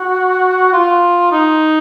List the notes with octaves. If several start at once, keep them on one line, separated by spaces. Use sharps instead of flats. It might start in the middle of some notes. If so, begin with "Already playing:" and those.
Already playing: F#4
F4
D#4